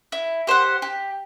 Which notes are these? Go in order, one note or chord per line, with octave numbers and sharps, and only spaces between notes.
E4
G4 C5 F#5
G4